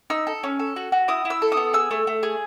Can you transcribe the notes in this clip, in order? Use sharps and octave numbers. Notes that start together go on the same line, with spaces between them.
D#4 E6
A4
C#4
A4
F#4
F#4
E4 D#6
E4
E6
A4
D#6
B3
G#4 E6
A3
A3
G#4